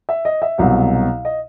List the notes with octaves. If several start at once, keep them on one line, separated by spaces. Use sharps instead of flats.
E5
D#5
E5
C2 B2 F#3 F5
D#5